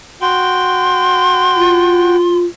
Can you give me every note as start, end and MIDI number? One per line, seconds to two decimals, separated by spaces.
0.22 2.16 66
0.22 2.16 79
0.22 2.37 84
1.56 2.46 65